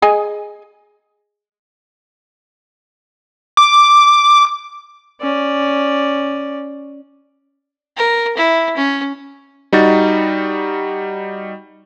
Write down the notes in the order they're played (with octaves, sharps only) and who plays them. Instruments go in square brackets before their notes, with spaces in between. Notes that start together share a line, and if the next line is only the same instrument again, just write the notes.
[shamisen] G#4 D#5 G#5
[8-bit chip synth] D6
[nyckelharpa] C#4 D5
[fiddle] A#4
E4
C#4
[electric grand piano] G3 D#4 F#4 A6